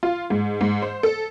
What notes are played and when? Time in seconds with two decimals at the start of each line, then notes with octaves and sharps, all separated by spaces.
0.03 F4
0.30 G#2
0.61 G#2
0.82 C5
1.03 A4